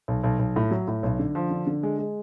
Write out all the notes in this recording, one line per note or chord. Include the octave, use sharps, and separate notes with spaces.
B1
B1
B1
A2
F#3
A2
B1
D3
F3
D3
D3
G#3
G#3